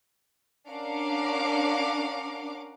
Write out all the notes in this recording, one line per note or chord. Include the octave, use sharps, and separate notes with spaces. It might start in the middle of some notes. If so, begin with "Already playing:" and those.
C#4 D4 A#4 F5 F#5 D6